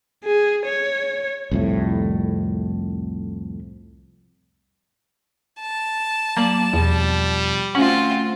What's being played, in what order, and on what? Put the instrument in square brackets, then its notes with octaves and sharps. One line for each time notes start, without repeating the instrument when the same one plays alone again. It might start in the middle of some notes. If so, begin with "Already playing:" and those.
[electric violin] G#4
C#5
[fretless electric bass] C2 F2 A2
[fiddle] A5
[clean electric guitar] F#3 D5 [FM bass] A#3
[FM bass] E2 [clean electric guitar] B2 F3 [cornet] G3
[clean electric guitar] A3 F#4 F#5 [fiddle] C4 F4 [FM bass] C#4